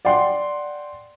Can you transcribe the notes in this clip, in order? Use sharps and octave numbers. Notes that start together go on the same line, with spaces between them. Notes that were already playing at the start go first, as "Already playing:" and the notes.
D5 F#5 G5 C6